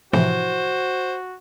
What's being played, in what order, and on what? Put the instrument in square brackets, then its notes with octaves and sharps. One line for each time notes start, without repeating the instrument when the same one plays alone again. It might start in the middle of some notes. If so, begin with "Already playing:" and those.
[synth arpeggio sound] A2 C3 E3 [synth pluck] F3 E4 [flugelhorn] F#4 [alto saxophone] C5